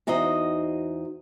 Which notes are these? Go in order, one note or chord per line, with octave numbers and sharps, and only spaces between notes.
E2 D#4 F#4 C5 D#5